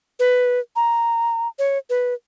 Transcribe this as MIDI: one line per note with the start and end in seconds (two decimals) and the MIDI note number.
0.20 0.60 71
0.76 1.48 82
1.59 1.78 73
1.90 2.14 71